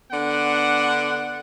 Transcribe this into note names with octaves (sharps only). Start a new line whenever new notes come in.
D3 B3 D4 F#5